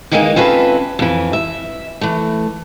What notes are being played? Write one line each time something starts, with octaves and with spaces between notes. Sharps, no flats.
D#3 E3 G#3 A#3 C#4 D#4
C4 C#4 F4 A4 B4 E5
F2 E3
E5
E3 A3